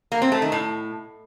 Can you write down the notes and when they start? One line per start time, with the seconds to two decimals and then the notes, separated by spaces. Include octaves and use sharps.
0.12 A#3
0.22 C4
0.32 A3
0.42 D#3
0.52 A2